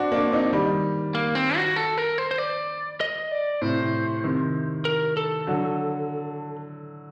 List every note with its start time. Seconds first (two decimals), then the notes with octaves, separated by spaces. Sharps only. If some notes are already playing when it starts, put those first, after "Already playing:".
Already playing: C4 D4 F#4
0.12 A#3 D4
0.32 C4 D#4
0.53 D#3 G3
1.15 A#3
1.35 C4
1.56 F#4
1.76 A4
1.98 A#4
2.18 C5
2.31 C5
2.38 D5
3.01 D#5
3.32 D5
3.61 A2 C3 C5
4.24 C3 D#3
4.85 A#4
5.17 A4
5.47 D3 F#3